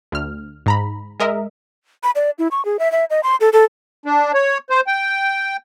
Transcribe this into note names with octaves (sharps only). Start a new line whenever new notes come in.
D2 F6
G#2 A#5 B5
G#3 A#4 D#5 E5
B5
D5
E4
C#6
G#4
E5
E5
D#5
C6
A4
A4
D4
C#5
C5
G5